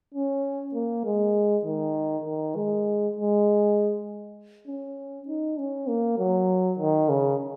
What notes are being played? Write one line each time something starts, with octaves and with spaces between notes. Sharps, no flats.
C#4
A#3
G#3
D#3
D#3
G#3
G#3
C#4
D#4
C#4
A#3
F#3
D#3
C#3